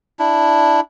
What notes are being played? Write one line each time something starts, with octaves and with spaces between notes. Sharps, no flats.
D4 E4